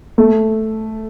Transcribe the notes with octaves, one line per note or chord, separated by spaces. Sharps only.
A3